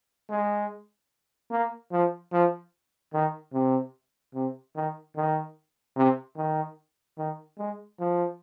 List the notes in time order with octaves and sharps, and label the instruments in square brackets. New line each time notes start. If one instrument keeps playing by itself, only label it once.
[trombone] G#3
A#3
F3
F3
D#3
C3
C3
D#3
D#3
C3
D#3
D#3
G#3
F3